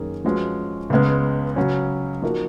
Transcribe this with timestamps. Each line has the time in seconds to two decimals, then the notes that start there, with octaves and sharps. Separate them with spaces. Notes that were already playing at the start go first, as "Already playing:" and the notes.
Already playing: F#2 D#3 A#3 C#4 G#4
0.25 F3 G#3 C#4 F#4 B4
0.90 C#2 C#3 G#3 B3
1.56 C#3 F#3 C#4
2.22 F3 A#3 D#4 F#4 A#4